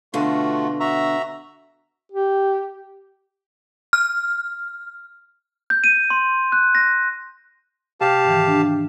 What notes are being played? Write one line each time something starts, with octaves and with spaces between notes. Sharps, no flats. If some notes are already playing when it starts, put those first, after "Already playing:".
B2 D3 A3 F4 F#4
F#4 E5 A#5
G4
F6
G6
D#7
C6
F#6
A#6
C3 G4 F5 A5 F6
G#2 D#3 E3
D4